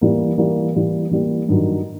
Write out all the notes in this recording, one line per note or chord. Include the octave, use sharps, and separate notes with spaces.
E3 G3 A#3
E3 G3 A#3
E3 G3 A#3
E3 G3 A#3
G2 D#3 F#3